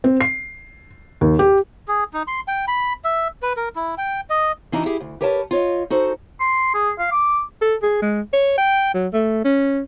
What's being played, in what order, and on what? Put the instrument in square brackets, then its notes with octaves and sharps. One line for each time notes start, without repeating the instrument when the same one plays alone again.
[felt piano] C4
C7
D#2
G4
[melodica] G#4
D#4
C6
G5
B5
E5
B4
A#4
E4
G5
D#5
[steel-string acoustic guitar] E3 D4 D#4 F#4 A#5
E4 G4 G#4
D2
G4 A#4 B4 C#5 E5 A5
F4 C#5 D#5
D#4 F#4 A4 C5
[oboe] C6
G#4
F5
D6
[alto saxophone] A4
G#4
G#3
C#5
G5
F#3
A3
C#4